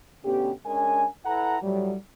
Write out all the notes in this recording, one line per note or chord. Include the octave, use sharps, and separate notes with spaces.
B2 D3 A3 B3 C#4 G4
G#3 C#4 D4 A#4 G#5
E4 A4 B4 F#5 G#5 A#5
A2 F#3 G3